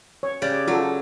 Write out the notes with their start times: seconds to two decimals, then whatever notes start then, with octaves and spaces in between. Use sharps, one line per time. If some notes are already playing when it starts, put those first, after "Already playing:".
0.23 C#5
0.42 C#3 G4 D5
0.68 F#3 F4 A4